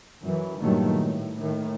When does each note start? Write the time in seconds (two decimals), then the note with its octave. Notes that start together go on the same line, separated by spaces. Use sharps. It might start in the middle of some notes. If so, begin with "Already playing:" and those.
0.22 F#2 E3
0.58 G2 A#2 D#3 F#3 A3
1.01 A2
1.37 A2 D#3